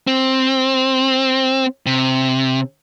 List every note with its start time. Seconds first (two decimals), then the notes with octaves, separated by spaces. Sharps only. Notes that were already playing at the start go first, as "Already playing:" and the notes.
0.07 C4
1.86 C3